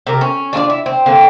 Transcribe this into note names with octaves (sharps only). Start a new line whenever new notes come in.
C3 A#4
C#4
D4 F4 A4 D5
E4
C4
D3 A#3 C4